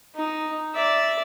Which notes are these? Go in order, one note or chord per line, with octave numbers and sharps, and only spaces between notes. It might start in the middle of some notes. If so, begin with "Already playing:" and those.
D#4
D5 E5